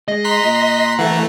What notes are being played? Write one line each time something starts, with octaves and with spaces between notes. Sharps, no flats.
G#3 D#5
A#5 C6 F#6 B6
A#2
E3 A3 F5 F#5